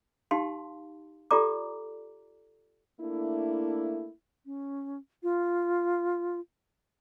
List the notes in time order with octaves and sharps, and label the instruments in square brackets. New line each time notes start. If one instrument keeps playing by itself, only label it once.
[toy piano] D#4 G4 F5 A5 C6
F4 G4 A4 D5 A#5 D6
[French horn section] A3 A#3 D4 E4
[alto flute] C#4
F4